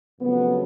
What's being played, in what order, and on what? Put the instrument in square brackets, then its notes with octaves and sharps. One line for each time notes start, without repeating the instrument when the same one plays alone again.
[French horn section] F2 C#3 F#3 A3 B3